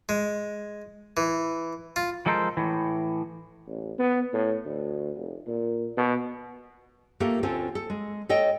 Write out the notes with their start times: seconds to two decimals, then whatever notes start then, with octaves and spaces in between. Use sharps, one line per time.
0.09 G#3
1.17 E3
1.96 F4
2.26 F3 G#3 A4 A#4 C5
2.57 A2 E3
3.67 A1
3.98 B3
4.33 A2
4.65 D2
5.16 F1
5.47 A#2
5.97 B2
7.20 A3 A#3 F4 G4 A4 A#4
7.43 D2 C4 C#4 F4 A4
7.75 A4
7.90 G#3
8.29 A4 C#5 D#5 G5